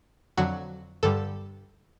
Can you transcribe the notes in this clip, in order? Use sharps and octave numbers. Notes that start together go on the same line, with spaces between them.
F2 D3 F#3 F#4
G2 D3 G3 A4